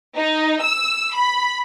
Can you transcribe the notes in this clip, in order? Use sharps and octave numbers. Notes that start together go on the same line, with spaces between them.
D#4
E6
B5